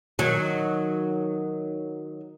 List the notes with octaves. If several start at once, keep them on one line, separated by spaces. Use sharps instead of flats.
D#3 F#3